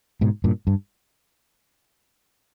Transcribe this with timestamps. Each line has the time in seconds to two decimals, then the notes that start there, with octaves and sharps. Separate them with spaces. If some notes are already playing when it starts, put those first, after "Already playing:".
0.21 G#2 B2
0.44 G2 A#2
0.67 G2